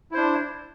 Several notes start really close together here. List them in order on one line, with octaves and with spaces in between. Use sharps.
E4 C5 D4